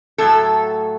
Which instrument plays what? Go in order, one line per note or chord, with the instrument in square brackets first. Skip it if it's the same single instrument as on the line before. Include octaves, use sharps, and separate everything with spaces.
[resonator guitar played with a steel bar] A2 F#3 A3 A4